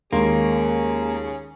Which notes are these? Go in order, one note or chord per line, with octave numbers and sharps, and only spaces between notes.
D#2 G#3 A#3 C#4 G#4 C6